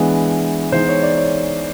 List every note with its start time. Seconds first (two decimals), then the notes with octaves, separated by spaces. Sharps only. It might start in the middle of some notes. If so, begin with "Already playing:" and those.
Already playing: E3 G#3 B3 D4
0.72 E3 G#3 B3 D#4 C5
0.88 C#5
1.03 D5
1.17 C#5